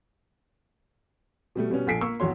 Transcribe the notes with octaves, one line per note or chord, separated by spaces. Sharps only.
B2 G3 A3
B2 G3 B3 C#4
A#1 A4 G#5 B6 C7 D7
A#3 C#6 E6
G#1 E2 F#4 C#5 C6